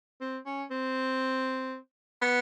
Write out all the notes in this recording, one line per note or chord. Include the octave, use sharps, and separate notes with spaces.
C4
C#4
C4
B3